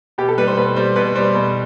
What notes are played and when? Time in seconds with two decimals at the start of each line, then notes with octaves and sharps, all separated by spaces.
0.18 B2 G4
0.28 A4
0.38 G3 B4
0.48 C5
0.57 B2 B4
0.76 G3 C5
0.96 B2 B4
1.15 G3 C5
1.35 B2